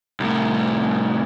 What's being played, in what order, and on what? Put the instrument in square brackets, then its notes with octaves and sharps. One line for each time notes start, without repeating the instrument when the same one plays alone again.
[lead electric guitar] C2 A2